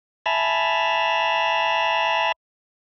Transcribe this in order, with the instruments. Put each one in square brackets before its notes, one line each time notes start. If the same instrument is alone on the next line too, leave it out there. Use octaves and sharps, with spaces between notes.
[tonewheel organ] E5 G#5 A5 B5 E6 F6